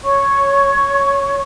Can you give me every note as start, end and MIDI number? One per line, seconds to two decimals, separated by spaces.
0.03 1.41 73
0.03 1.41 85